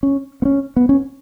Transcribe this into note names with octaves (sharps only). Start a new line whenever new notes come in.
C#4
B3
C#4
B3
C#4